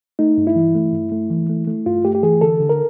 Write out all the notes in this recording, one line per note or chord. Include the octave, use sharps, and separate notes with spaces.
A3 D#4
G2
E4
E3
A3
G2
A3
E3
A3
A3
G2 F4
A3 G4
G4
E3 G#4
D3 A4
D3
A#4